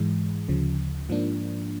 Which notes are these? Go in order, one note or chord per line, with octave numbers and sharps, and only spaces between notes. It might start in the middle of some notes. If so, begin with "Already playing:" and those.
Already playing: G#2 E3 G#3
D2 C#3 F3
G#2 F3 A#3 D4